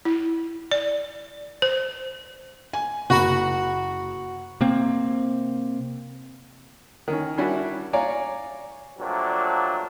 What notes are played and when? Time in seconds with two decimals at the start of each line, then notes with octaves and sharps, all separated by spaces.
0.05 E4
0.71 D5
1.62 C5
2.73 G#5
3.10 F#1 F#4 B5
4.61 C3 A#3 C4
7.08 D#3 C#4
7.38 G3 C#4 D4 E4 F#4
7.93 C#5 D5 F5 G#5 A#5
8.99 A#2 F3 F#3 A3 D4 G4